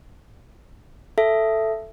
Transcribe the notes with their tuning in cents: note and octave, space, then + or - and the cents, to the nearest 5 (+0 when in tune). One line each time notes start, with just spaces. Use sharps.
A4 +0 E5 +10